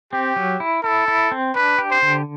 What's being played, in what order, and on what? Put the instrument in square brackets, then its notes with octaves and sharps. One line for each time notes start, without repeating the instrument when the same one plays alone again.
[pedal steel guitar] C4 [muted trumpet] G4
[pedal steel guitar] F#3
E4
[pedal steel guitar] E4 [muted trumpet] A4
[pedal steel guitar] E4
C4
[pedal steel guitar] D4 [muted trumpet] B4
[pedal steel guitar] G4
[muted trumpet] C5
[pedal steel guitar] D3